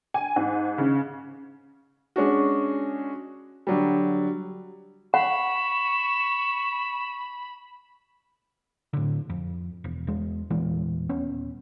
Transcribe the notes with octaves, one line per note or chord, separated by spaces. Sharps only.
G#5
G#2
C#3
G#3 C#4 D4 F#4
D3 F#3 G3
F#5 B5 C#6 E7
A2 D3
F2
E1
E2 G#3
E2 A#2 E3 G#3
D#1 B3 C#4